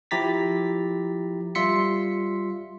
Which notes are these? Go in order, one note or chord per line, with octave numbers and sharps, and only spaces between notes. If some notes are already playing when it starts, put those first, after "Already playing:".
F3 E4 G4 A#5 A6 B6
G3 F4 E5 C6 B6 C#7